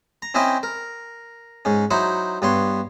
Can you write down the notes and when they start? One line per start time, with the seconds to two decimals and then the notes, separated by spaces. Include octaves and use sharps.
0.22 A#5
0.34 C4 C#4 E4 D#5 E5 G5
0.63 A#4
1.65 G#2 C#4
1.91 F#3 D#4 E4 C5 F#5
2.42 G2 B3 C#5 C6